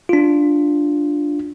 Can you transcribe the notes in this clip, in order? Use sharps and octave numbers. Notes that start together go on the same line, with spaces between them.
D4 F4